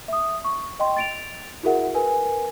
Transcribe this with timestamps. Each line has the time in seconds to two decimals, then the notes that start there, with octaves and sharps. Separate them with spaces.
0.08 E5 D#6
0.44 C#6
0.79 D#5 G5 C6
0.97 A6 D7 F7
1.63 E4 F#4 G#4 A#4 E5 F#5
1.94 A#4 B4 G#5